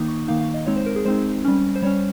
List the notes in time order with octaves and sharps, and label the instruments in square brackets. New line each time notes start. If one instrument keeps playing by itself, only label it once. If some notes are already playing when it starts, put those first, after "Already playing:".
Already playing: [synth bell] D#3 A#3 D#4 D#6
C#6
D#3 A#3 D#4 F5
F5
D#5
G#3 C4 D#4 C#5
C5
A#4
G#4
G#3 C4 D#4 C5
G3 C#4
C5
G3 C#4 C#5